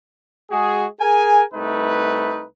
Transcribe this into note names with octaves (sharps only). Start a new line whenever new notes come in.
G#3 F#4 G#4
G#4 A#4 G#5
C2 A3 D#4 B4